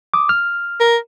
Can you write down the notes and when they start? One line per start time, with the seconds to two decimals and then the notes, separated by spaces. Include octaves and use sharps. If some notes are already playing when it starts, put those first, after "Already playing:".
0.14 D6 D#6
0.29 F6
0.80 A#4